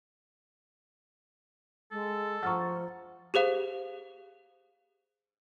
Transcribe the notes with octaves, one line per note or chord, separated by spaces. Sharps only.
G#3 A4
F3 F#5 A#5 C#6 F6 A6
G4 G#4 C5 F5